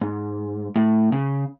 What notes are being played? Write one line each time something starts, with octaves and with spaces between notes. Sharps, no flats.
G#2
A2
C#3